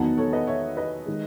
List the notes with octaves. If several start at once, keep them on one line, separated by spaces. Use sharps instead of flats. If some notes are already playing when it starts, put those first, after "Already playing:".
Already playing: E2 D#3 F#3 B3 D#4 F#5 A5
A4 C#5
B4 D#5
C#5 E5
B4 D#5
D#3 G#3